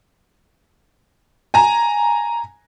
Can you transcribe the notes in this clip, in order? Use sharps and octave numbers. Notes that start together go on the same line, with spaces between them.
G#5 A#5